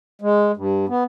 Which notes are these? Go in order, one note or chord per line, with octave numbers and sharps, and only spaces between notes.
G#3
G2
B3